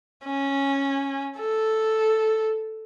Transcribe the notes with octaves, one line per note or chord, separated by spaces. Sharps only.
C#4
A4